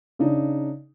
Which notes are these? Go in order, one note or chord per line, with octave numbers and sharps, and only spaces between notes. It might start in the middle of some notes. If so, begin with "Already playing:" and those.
C#3 D4 D#4